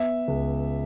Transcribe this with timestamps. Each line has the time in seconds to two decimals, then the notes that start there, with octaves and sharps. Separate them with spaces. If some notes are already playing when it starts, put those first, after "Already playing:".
Already playing: B3 E5
0.28 C#2